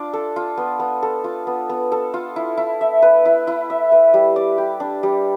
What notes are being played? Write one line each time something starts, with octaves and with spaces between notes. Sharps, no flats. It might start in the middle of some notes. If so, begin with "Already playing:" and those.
Already playing: D4 F4 D5
A4
F4
B3
B3
A4
F4
B3
B3
A4
F4
E4
E4
E5
B4
E4
E4
E5
B4
G3
D5
G4
D4
G3